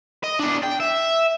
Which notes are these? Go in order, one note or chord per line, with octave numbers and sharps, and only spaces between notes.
D#5
E2 D4
G5
E5